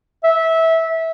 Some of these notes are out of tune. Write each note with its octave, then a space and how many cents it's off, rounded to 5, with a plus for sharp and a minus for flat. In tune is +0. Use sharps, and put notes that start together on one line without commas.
E5 -20